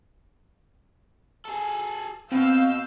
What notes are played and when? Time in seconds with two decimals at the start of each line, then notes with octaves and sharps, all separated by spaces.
1.45 G#4 A4
2.32 B2 C4 F5 E6 G6